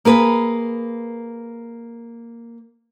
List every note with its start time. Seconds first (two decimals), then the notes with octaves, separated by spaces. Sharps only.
0.05 A#3 G#4 B4